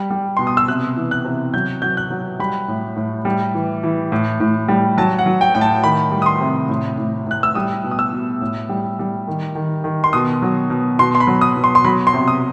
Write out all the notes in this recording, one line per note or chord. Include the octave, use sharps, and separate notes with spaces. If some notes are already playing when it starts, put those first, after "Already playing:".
Already playing: G3
G3
B2 C6
D#6
E6
C3 F#6
E3
F#6
C3
F#3 G6
F#3 G6
F#6
F#3
G3 B5
A2
A2
G3
E3
E3
A2
A2
G3
F#3 A5
F#5
F#3
G5
A2 G5
A5
D#3 B5
G3
D#6
C6
C3
A2
A2
A2 F#6
E6
G3 D#6
B2
D#6
E6
B2
A2
G3
G3
D#3
D#3
D#3
C6
B2 D#6
F#3
B2
B2 C6
C6
B5
F#3
D#6
B2
C6
C6
F#3 B5
C6
C3
D#6